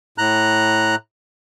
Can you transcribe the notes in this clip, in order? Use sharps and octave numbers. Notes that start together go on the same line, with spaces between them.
A2 A#5 F#6